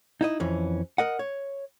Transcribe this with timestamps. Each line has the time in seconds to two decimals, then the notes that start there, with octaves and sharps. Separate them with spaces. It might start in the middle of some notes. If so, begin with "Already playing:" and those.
0.21 D#4 E4 D#5
0.40 F2 E3 C#4
0.98 A#4 D#5 F#5
1.19 C#5